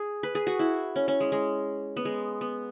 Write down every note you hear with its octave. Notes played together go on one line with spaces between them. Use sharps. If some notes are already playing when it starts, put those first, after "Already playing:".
Already playing: G#4
B4
G#4
F#4
E4
C#4
C#4
G#3
G#3
B3
G#3
B3